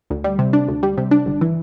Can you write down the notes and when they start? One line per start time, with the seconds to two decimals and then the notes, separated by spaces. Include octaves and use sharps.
0.10 D2
0.24 G3
0.39 C3
0.53 D4
0.68 D2
0.83 G3
0.97 C3
1.11 D4
1.26 G1
1.41 E3